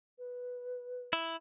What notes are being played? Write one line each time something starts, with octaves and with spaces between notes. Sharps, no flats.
B4
E4